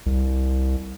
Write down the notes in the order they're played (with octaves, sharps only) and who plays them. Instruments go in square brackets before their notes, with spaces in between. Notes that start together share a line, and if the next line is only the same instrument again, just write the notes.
[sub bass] C2